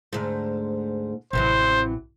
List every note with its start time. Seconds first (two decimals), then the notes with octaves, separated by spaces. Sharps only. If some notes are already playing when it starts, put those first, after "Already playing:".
0.13 D2 G#2
1.33 A1 C3 E3 F#3 C5